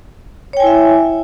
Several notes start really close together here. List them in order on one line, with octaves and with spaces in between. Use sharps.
C#5 G5 G#5 E4 E5